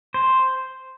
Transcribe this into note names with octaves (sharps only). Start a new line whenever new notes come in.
C5